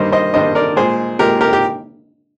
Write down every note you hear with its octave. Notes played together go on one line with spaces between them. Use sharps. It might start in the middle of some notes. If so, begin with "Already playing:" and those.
Already playing: G2 D#3 G3 A#3 C5 D#5
C5 D#5
G2 D#3 G3 A#3 C5 D#5
A#4 D5
A#2 G#3 G#4 C5
A#2 G#3 G4 A#4
G4 A#4
G4